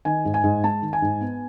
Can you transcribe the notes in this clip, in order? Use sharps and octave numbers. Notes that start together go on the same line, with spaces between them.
D#3 G#5
G#2
G#5
G#2
G#3 A5
D#3
G#5
G#2
B3